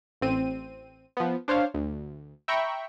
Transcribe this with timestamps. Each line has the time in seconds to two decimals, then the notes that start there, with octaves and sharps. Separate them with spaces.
0.21 A1 C4 D#7
1.17 F3 B3
1.48 D4 C5 C#5 F5
1.74 D2
2.48 E5 G5 A#5 B5 C#6